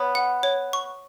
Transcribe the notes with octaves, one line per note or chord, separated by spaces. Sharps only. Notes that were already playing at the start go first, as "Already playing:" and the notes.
Already playing: B3 C#5
F#5
C#5
C#6